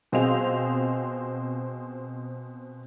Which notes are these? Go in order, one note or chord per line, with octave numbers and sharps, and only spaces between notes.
B2 C4 F4 G#4 D#5 F7